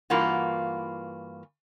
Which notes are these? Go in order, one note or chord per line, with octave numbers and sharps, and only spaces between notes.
G2 E3 A#3 F4 F#4